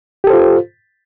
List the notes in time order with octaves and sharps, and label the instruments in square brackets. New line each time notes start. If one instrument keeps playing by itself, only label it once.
[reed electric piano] G4
A4
C5
F4